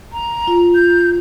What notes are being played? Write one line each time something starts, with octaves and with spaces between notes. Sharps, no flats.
A#5
F4
G6